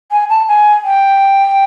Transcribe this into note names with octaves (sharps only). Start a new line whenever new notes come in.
G#5
A5
G#5
G5